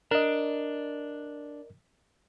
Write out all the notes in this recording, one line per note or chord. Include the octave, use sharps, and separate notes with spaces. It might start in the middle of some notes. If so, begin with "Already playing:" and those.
D4 A#4 D#5